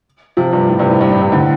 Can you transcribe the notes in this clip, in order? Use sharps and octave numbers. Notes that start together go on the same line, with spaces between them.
C3 F3
G2 C3
A2
G2 C3
A2
G2
A2
G2 C3
A2 D3